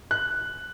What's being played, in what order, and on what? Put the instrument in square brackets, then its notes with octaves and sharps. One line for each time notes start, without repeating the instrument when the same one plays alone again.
[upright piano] F#6